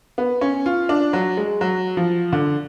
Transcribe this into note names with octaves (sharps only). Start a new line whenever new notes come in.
B3
C#4
F4
D4
F#3
G#3
F#3
F3
D3